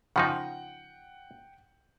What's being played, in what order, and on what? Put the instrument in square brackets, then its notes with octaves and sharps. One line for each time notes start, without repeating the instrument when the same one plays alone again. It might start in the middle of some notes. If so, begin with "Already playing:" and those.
[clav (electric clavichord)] C#3 F3 D#4 [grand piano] F#5 G5